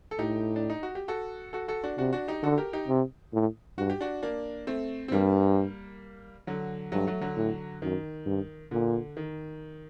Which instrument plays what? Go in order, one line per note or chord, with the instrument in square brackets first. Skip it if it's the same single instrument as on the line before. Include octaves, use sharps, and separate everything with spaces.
[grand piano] A4
[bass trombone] A2 [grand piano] D#4 G4
[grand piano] D4
D#4
F#4
G4
F#4 A4
F#4 A4
F#4 A4
D4 F#4
[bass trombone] C3 [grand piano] D4 F#4
[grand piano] D4 F#4
D#4 G4
[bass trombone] D3 [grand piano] F#4 A4
[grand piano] G4 A#4
D#4 G4
[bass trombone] C3
A2
[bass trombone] G2 [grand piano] F#4
[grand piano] G4
D4 F#4
A#3 D4
A3 C4
C4
[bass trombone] G2 [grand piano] G3 A#3
[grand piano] D3 F#3
[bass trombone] G2 [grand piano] F#3 A3
[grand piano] F#3 A3
D3 F#3
[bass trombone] A2
[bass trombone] F#2 [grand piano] D#3
[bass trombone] G2
[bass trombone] A#2 [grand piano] D3
[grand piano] D#3